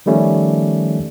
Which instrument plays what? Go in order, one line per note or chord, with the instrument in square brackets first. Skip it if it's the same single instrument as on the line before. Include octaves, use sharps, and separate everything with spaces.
[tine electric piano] D#3 F3 G3 A3 C#4